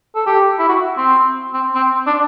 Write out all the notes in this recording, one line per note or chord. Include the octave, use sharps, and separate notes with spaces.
A4
G4
E4
F#4
C4
C4
C4
D4